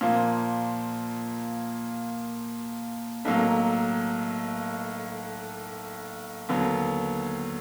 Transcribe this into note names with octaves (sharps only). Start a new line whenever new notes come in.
A#2 F3 A#3
B1 A2 F#3 A#3
D#2 D3 F#3 B3